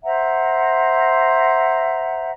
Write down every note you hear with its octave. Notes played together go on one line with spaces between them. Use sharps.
C5 E5 F#5 A#5